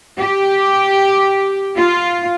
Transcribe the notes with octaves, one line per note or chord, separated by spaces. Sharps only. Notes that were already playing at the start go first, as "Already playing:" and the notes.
G4
F4